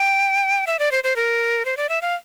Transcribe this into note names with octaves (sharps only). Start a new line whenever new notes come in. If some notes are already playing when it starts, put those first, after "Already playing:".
Already playing: G5
E5
D5
C5
C5
A#4
C5
D5
E5
F5